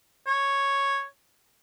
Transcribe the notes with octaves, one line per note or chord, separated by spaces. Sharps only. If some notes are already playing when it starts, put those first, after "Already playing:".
C#5